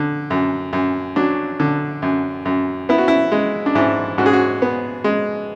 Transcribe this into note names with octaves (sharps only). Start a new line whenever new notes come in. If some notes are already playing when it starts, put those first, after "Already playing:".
Already playing: D3
F#2
F#2
F#3 D4
D3
F#2
F#2
B3 E4
F#4
E4
G#3
D4
G#2 E4
G#2 F#4
G#4
F#4
B3
G#3